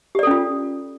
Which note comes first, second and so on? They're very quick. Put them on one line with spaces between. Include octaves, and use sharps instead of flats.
G4 D5 A4 C#4 F4